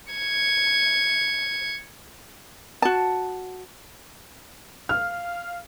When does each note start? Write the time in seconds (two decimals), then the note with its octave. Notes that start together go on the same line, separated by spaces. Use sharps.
0.13 G#6 C#7
2.82 F#4 A5
4.89 F5 F6